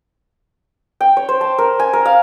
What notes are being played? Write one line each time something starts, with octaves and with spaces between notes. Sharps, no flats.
G5
C#5
C5
A5
A#4
G#5
A#4
F5